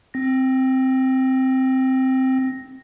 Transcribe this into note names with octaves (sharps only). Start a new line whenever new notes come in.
C4 A#6